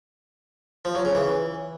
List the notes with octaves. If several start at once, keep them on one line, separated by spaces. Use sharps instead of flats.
F3
F#3
C#3
E3